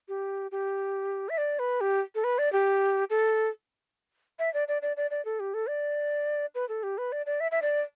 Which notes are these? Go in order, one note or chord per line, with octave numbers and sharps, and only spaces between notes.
G4
G4
E5
D5
B4
G4
A4
B4
D5
G4
A4
E5
D5
D5
D5
D5
D5
A4
G4
A4
D5
B4
A4
G4
B4
D5
D5
E5
E5
D5